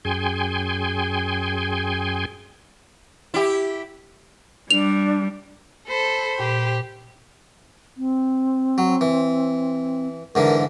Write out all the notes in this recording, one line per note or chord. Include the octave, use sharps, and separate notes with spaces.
F#2 G#4 G5 G#5 C6
E4 G4
G3 D4 F7
A4 C5 B5
A#2 G4
C4
F#3
E3
G#2 D3 E3 A#4